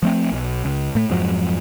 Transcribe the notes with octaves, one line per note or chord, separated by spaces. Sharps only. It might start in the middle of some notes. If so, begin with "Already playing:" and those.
F3 A3 C4
B1
C#2
A2 A3
F2 G#2 F3 F#3